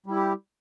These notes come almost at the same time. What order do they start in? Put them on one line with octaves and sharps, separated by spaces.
G3 E4 G4